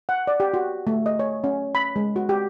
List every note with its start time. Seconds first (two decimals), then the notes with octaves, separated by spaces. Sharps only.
0.09 F#5
0.27 D5
0.40 G4
0.54 F#4
0.87 A3
1.06 D#5
1.19 C#5
1.44 C#4
1.75 B5
1.96 G#3
2.16 F#4
2.29 G4